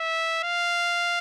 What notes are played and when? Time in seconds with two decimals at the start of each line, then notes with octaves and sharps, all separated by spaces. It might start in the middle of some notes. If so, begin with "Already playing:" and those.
Already playing: E5
0.43 F5